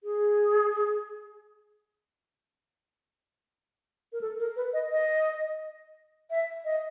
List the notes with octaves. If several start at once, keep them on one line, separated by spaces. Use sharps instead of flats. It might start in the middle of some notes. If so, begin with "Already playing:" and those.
G#4
A#4
A4
A#4
B4
D#5
D#5
E5
D#5